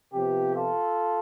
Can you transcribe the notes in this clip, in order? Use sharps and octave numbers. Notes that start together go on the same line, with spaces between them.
C3 F3 B3 G4
F4 A4